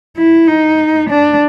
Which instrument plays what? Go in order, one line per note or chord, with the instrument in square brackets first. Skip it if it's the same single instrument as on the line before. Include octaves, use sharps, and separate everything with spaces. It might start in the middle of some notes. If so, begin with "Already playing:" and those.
[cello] E4
D#4
D4